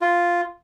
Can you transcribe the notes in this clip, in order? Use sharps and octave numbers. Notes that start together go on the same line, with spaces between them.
F4